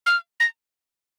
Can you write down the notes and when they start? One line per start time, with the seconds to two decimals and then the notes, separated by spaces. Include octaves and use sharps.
0.06 F6
0.40 A#6